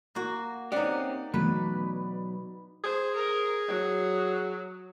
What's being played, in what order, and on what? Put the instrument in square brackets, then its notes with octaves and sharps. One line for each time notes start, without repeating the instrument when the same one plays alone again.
[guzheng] A#3 F#4
[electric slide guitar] C4 C#4 G4 [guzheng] D#4 F#5 [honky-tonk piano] D5
[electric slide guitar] B2 F#3 [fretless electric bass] E3 A3 B3 [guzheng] B4
[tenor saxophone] G#4 [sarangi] C5
[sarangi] A#4
F#3